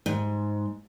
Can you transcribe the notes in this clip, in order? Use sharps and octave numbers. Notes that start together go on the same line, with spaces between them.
G#2